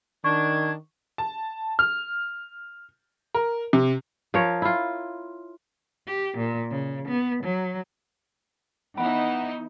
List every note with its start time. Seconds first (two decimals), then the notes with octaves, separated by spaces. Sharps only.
0.24 D#3 D4 C#6 G#6
1.18 A5
1.79 F6
3.35 A#4
3.73 C3
4.34 F3 A#4 C#5
4.62 E4 F4
6.07 G4
6.37 A#2
6.70 C#3
7.07 B3
7.43 F#3
8.98 E3 B3 D#4 E4 F#5